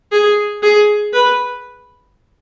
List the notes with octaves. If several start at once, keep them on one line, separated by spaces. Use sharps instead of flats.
G#4
G#4
B4